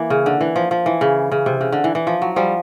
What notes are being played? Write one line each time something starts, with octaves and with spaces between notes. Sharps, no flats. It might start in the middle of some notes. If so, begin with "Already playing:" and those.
Already playing: E3 A#3
C#3
D3
E3
F3
F3
E3
C#3
C#3
C3
C#3
D3
E3
E3
F3
F#3
F3 G3